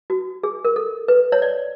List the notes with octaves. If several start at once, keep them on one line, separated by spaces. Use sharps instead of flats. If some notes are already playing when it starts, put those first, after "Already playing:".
F#4
G#4
A#4
A4
B4
C#5
D5